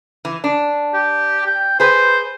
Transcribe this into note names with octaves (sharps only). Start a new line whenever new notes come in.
E3
D4
G4
G5
G#4 B4 C5